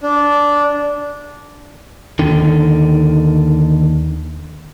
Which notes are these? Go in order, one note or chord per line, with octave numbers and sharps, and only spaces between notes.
D4
D#2 D3 D#3